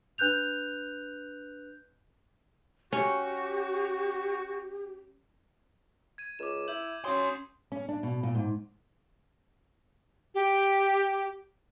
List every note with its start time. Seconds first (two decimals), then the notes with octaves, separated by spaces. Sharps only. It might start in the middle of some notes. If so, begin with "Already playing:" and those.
0.18 D4 B4 F#6 G6 F7
2.93 C#4 F#4 G4
6.18 G#6 D#7
6.39 C#2 D6 E7
6.68 E4 G6 F#7
7.05 F#3 C#4 C6 D#6 G6
7.72 C#4
7.89 D4
8.03 B2
8.23 A#2
8.35 G#2
10.35 G4